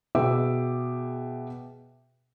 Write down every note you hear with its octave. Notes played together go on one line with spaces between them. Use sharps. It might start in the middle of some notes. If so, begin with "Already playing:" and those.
B2 G#4 B4 E5 G5 D6